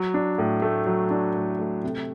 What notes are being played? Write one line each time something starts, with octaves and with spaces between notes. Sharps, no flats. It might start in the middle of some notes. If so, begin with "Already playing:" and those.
Already playing: F#3
D4
A2
A3
F#3
D4
A2
A3
C3